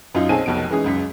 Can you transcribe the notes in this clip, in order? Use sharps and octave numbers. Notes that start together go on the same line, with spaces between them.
F#2 D#4 F4
B1 C4 G#4 G#5 A5 D#7
F1 B1 F2 B2 D7
E3 G#3 C#4 D#4 G#4
C#2 F#2 B6